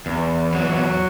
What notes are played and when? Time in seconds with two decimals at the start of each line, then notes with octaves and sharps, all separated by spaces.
0.06 E2
0.53 F#3